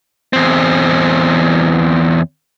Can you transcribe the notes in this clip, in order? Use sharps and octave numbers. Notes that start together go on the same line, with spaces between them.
E2 C4